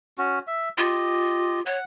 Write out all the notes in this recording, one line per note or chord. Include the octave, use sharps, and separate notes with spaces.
C#4 F#4
E5
F4 G4 D#5
C#5 F#5